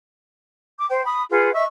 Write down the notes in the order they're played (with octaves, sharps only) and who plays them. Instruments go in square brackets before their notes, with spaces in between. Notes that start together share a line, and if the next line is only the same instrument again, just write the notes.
[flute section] D6
C5 G5
B5 D#6
F4 G#4 B4 F#5
D#5 E5 C#6 E6